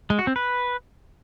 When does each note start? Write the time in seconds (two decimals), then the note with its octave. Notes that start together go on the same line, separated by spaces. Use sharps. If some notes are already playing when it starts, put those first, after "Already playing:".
0.10 G#3
0.19 F#4
0.27 C4
0.36 B4